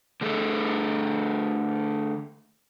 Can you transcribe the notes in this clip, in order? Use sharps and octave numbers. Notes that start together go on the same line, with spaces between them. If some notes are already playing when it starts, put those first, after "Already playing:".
D3 A3 G#4 A4